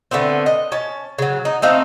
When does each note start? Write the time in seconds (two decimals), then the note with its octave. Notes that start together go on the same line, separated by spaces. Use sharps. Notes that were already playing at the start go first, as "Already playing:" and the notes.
0.11 D3 A3 B3 C4
0.46 D#5
0.72 C#4 A5
1.18 C#3 F#3
1.45 D#4
1.62 A3 C4 D#4 F5